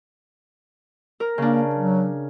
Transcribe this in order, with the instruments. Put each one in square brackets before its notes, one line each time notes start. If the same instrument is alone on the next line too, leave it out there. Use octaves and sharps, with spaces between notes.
[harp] A#4
[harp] C#3 D4 [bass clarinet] A#3
[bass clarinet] F#3